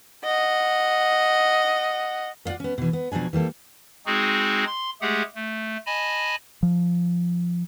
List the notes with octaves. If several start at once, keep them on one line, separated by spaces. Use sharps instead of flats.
D#5 F#5
B3 F4 D5 F5 F#5
B3 C#4
B2 E3
B3
B2 F3 F#3 D4 G#5
E3 G3 A#3 A4
G#3 C4 D#4 F#4 G#4
C6
G#3 A3 G4 G#4 F#5
A3
D#5 G#5 A5 B5
F3